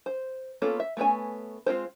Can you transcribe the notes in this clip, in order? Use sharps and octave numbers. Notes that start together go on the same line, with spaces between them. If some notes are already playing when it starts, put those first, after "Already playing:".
C5
A#3 B3 C#4 F4 A4
E5
A3 B3 C#4 G#5
G#3 C4 F4 C5